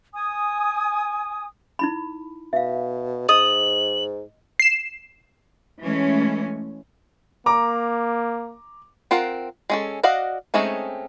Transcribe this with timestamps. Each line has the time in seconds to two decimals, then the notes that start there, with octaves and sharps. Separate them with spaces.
0.14 G#5 D#6
1.79 D#4 E4 B5
2.53 B2 E5 F5
3.29 G#2 D#5 D#6 F#7
4.60 C7 E7
5.82 E3 G#3 A3 C#4
7.46 A#3 A#5 D6
9.11 C4 F4 A#4 F#5
9.70 G#3 C#4 A4
10.03 F#4 D5 D#5 F5 F#5
10.54 G#3 A3 C4 C#4 D#4